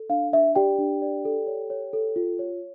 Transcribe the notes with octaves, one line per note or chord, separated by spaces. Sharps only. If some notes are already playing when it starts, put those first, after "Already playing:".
Already playing: A4
D4 F5
D4 E5
G4 D5 G5
D4
D5
A4
C#5
C#5
A4
F4
C#5